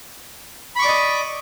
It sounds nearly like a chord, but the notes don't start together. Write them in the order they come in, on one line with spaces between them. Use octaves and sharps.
B5 C#6 D6 D5 D#5